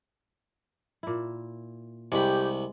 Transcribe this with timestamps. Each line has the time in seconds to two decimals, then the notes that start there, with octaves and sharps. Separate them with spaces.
1.03 A#2 E4
2.12 C2 G#3 G4 B5